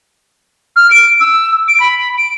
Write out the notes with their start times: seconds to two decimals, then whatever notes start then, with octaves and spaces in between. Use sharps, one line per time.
0.76 F6
0.91 D7
1.20 E6
1.68 D7
1.80 B5
2.18 D7